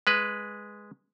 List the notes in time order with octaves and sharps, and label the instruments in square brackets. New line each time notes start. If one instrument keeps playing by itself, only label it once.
[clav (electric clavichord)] G#3 B4